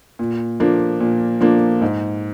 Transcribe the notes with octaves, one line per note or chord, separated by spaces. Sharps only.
A#2
F3 A#3 D4
A#2
F3 A#3 D4
G#2